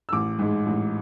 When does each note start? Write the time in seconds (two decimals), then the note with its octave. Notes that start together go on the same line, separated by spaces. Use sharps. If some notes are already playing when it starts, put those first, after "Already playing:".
0.09 E6
0.12 A1 D6
0.39 G#2 G#3
0.66 A1